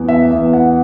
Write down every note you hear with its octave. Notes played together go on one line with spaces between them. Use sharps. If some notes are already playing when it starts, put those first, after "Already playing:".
Already playing: E2
E5
E2
F#5